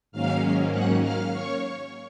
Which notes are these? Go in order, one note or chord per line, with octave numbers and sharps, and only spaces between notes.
G#2 D#3 F#3 A#3 C#4 F5 F6
F#5 F#6
F5 F6
C#5 C#6